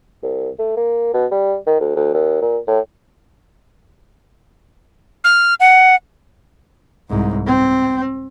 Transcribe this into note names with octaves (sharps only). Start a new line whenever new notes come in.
C2
A3
A#3
B2
G3
D#3
D2
D2
D#2
A#2
A2
F6
F#5
C2 G#2
C4